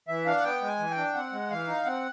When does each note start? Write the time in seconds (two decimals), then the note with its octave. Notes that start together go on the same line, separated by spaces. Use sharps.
0.08 E3 E5
0.26 D4 F5
0.37 F#5
0.44 B3 G5
0.61 G#3
0.67 G#5
0.79 E3
0.90 G5
0.97 D4
1.15 C4 F#5
1.32 G#3
1.51 E3 F5
1.67 D#4
1.85 C4 F#5